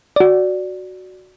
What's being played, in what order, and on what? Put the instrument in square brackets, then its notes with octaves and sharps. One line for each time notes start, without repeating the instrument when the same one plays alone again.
[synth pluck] F#4 D5